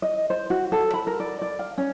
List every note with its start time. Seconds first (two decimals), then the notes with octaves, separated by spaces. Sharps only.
0.02 D#5
0.30 C5
0.50 F#4
0.72 A4
0.94 B5
1.07 A#4
1.20 D5
1.42 D5
1.59 F5
1.78 C#4